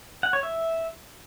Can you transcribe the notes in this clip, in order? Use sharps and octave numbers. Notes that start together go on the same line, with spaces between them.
F#5
C#5
E5